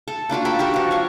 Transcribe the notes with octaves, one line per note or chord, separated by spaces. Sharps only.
A4
A#3 D4 F4 F#4
A4 G5 B5
F#4 G4 A4 A#4
F3 F#4
C#5 F5